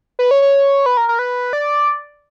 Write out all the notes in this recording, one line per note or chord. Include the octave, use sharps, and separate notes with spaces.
B4
C#5
C#5
B4
A#4
A#4
B4
D5